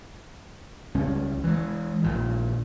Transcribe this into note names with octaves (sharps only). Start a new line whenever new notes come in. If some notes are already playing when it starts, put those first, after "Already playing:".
C#2 G3 C#4
E3 G#3
A#1 A#2 D#3